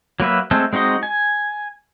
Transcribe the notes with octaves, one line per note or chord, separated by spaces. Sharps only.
F#3 A#3 B4 E5
G#3 A3 C4 A4
G#3 C4 D#4 F#4 D#5
G#5